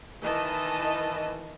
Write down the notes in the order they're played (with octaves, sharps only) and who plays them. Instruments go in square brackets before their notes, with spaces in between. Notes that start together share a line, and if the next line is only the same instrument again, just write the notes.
[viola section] D#3 E3 D#5 A5